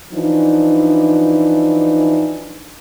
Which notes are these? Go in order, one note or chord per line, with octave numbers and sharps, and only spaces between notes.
E3 F3 D4 D#4